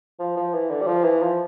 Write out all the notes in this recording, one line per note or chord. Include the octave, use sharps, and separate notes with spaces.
F3
F3
E3
D3
G3
F3
E3
F3